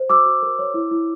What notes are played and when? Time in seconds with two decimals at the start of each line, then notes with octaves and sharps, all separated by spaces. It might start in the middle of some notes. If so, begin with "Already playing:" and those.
Already playing: C5
0.10 F#4 D6 E6
0.26 F#4
0.43 A#4
0.59 C#5
0.74 E4
0.91 E4